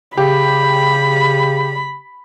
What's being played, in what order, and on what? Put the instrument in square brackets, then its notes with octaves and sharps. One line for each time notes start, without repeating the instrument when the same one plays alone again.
[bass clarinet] C#3 [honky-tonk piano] G4 [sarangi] B5